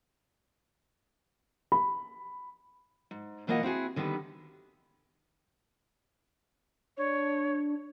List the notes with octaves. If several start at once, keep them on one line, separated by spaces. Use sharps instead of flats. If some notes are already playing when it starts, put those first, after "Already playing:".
B5
G#2
B2 E3 A#3 F4 D#5 F#5
C4 E4 F#4 G#4
D3 D#3 G3 B3 B4
D4 C#5